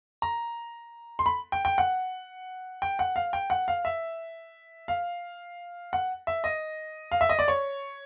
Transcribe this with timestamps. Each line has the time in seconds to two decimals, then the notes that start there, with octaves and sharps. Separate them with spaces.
0.22 A#5
1.19 C6
1.26 B5
1.52 G5
1.65 G5
1.78 F#5
2.82 G5
2.99 F#5
3.16 F5
3.33 G5
3.50 F#5
3.68 F5
3.85 E5
4.88 F5
5.93 F#5
6.27 E5
6.44 D#5
7.12 F5
7.21 E5
7.29 D#5
7.39 D5
7.48 C#5